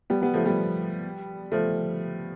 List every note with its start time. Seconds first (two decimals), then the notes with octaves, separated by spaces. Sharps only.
0.10 G3 B3
0.22 G3 B3
0.34 F3 A3
0.45 G3 B3
1.52 F3 A3